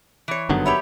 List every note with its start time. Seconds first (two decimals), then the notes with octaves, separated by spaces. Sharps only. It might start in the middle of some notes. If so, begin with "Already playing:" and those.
0.28 E3 C#5
0.49 F#1 G2 D3 D#3 F#3 B3
0.65 G4 C#5 E5 B5